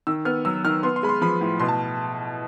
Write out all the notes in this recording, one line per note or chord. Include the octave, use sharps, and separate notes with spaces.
D#3 E6
B3 F6
F#3 E6
D#3 F6
B3 C6
C6
G#3 B5
C6
F3 B5
A2
B2 C6
A5